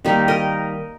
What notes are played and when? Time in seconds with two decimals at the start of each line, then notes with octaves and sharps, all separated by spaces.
0.05 D#3 G3 A#3 D#4
0.28 A#4 D#5